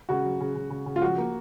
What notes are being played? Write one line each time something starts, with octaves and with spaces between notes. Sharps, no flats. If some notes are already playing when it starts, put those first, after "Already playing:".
C#3 F#4
F#3
C#3
C#3
C#3
C#3
F4
F3 F#4
A#3